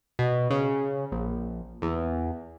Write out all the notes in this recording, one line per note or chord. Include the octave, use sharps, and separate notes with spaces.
B2
C#3
A#1
E2